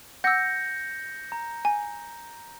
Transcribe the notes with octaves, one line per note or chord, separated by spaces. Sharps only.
F#5 D6 E6 G6 A#6 C#7
A#5
G#5